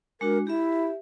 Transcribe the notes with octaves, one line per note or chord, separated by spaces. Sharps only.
G#3 D4 F#4 A#4
E4 G4 E5